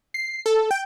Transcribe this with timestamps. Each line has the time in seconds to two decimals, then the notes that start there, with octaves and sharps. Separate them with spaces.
0.14 C7
0.46 A4
0.71 G5